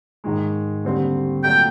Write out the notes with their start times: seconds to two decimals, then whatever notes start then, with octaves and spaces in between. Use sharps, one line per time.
0.24 G#2 D#3 G#3
0.84 D#2 D3 G3 C4
1.44 A#2 F#3 A3 G5